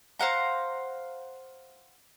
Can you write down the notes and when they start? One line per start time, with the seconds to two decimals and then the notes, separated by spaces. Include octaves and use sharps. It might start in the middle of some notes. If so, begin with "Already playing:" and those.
0.19 C5 F5 F#5 A#5